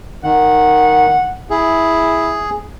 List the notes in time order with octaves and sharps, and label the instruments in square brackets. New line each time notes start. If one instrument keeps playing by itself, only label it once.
[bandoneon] D#3 [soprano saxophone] F#5
[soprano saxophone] E4 [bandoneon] G#4